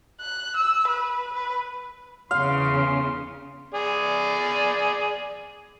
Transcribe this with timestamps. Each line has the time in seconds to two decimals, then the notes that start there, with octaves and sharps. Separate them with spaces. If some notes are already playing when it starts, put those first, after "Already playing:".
0.21 F#6
0.56 E6
0.88 B4
1.33 B4
2.31 E2 C#3 F5 C6
3.74 G#4 D5